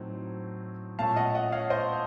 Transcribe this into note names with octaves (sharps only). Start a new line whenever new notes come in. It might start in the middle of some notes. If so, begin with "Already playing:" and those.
Already playing: A2 F#3 A3 C4 D#4
A#2 A3 C#4 F5 A5
D#5 F#5
D#5 F#5
C#5 F5
C5 D#5